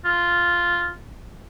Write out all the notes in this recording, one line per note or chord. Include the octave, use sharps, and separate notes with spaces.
F4